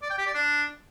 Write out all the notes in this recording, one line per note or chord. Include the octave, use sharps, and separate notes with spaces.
D5
G5
G4
D5
D4